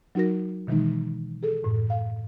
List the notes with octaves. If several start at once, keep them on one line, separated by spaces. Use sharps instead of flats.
F#3 D#4 F#4 A#4 A#6
B2 D#3 E3 G#3 D#4
G#4 A4
F#2 A2
F5